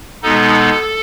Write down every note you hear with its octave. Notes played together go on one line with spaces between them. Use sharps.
B2 G#3 B3 D#4 A4